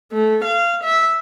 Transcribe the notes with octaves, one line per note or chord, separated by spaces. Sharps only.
A3
F5
E5